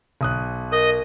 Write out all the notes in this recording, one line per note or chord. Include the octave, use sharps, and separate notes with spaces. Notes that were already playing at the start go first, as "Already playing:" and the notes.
B1 D#6 F#6
A#4 D#5